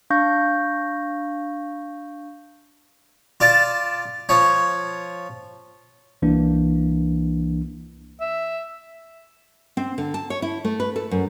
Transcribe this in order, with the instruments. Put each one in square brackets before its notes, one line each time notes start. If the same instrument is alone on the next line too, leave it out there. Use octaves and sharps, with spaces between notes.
[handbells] D4 F5 C#6 G6 A#6
[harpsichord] F4 D5 A5
F3 C#5
[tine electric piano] C2 E3 A#3 D4
[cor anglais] E5
[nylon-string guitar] C4
D3
A5
C#5
E4
A3
B4
A4
F#2